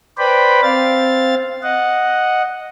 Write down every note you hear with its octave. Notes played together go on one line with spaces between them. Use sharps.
B4 C5 D5 G5 B5
C4 F5 A6
D#5 F#5